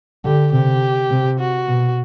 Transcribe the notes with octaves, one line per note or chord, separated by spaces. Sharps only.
D3 G4
C3 G4
C3
F#4
B2